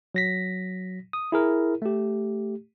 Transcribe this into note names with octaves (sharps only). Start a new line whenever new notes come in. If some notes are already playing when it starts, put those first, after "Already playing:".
F#3 A#6 B6
D#6
E4 G#4 A#4
A3 G4